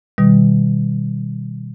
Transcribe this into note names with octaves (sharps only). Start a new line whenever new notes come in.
B2 D#3 G3